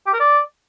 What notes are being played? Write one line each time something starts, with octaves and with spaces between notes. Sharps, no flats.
G4
A#4
D5